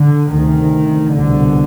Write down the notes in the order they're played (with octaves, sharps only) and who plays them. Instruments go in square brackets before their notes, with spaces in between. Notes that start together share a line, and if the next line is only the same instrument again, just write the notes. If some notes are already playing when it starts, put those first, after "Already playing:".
Already playing: [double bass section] D3
D2 C3 D#3
C2 B2 D3